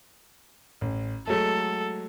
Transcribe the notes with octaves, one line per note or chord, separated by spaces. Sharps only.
A1
F#3 G#3 A3 A4